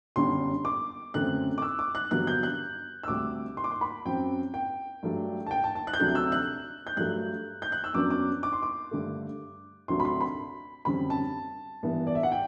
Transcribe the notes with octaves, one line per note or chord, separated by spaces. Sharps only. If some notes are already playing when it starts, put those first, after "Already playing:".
G1 F#2 D3 G3 D4 C6
D6
F#2 D3 A3 C4 F#6
D6
E6
D6
F#6
G2 D3 F#3 B3 F#6
G6
F#6
E6
D2 C3 G3 D6
C6
D6
C6
B5
F#2 F#3 C4 G5
G5
G2 F#3 A3 D4
A5
G5
A5
A5
F#6
G6
D2 C3 F#3 A3 D4 F#6
E6
F#6
G6
G2 F#3 A3 F#6
G6
F#6
E6
F#2 F#3 B3 D4 D6
D6
D6
C6
D6
G2 D3 A3
D2 C3 F#3 A3 D4 C6
B5
C6
B5
F#2 D3 G3 C4 B5
A5
G2 E3 B3
D5
E5
F#5
G5